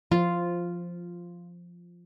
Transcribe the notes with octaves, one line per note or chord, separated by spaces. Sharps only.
F3 F4